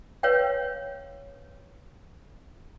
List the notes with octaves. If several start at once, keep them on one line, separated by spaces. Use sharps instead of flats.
B4 C#5 F5 G5